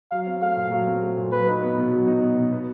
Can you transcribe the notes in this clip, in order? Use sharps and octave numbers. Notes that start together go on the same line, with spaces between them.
F#3 F5
C4
A3 F5
A#2
F#3
C4
A3
A#2
F#3 B4
D#4
B3
B2
F#3
D#4
B3
B2
B3